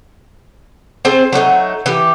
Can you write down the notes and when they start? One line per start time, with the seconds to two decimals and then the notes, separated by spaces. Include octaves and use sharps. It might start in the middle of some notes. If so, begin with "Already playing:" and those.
1.05 C4 G#4 C5 A5
1.32 F#3 A3 C4 D#4
1.86 E3 G4